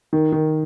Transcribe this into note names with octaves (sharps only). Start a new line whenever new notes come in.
D#3
D#3